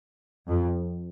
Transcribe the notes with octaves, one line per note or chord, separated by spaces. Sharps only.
F2